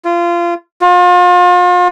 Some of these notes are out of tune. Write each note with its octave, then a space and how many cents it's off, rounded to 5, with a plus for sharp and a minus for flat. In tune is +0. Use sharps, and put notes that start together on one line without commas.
F4 -25
F4 +40